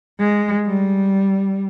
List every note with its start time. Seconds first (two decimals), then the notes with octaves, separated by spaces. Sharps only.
0.20 G#3
0.66 G3